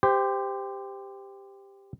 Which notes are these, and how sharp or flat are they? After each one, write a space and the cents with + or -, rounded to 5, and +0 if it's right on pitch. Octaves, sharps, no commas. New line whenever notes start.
G4 +10 C5 -20